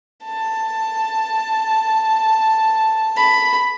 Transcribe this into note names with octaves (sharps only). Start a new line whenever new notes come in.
A5
B5